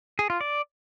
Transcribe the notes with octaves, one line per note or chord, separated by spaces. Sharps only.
G#4
F4
D5